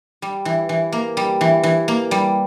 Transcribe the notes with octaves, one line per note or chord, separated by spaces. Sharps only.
G3
E3
E3
A#3
G3
E3
E3
A#3
G3